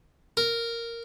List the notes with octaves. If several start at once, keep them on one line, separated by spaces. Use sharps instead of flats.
A#4